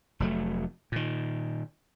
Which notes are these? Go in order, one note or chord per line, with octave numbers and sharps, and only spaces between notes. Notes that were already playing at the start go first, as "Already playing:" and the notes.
F1 F#3 A3
A#2 D#3